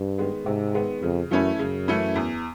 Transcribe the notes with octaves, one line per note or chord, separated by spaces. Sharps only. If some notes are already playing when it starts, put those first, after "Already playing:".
Already playing: G2
D#3 G#3 B3
G#2 C3
D#3 G#3 B3
F2 C#3
F#2 E3 A3 C#4 E4
F#2 C#3
E3 A3 C#4 E4
E2